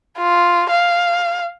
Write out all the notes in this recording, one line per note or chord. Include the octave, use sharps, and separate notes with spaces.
F4
F5